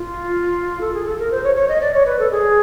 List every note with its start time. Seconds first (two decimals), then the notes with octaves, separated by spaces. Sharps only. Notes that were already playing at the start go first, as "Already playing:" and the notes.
Already playing: F4
0.81 A4
0.94 G#4
1.05 A4
1.19 A#4
1.31 C5
1.44 C#5
1.56 C#5
1.69 D#5
1.81 D5
1.94 C#5
2.06 B4
2.19 A4
2.31 G#4